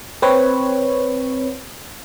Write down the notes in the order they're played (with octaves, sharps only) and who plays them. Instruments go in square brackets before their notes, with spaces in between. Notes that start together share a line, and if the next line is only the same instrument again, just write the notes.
[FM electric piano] C4 B4 C#5